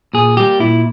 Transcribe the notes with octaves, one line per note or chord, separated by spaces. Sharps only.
A#2 G#4
G3 A#3 G4
A#2 E4